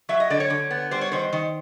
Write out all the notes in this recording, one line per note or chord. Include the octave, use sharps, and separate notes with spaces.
F#3 E5
D#5
D3 D5
C#5
D3
B3
G3 C5
C#5
D#3 C5
D#3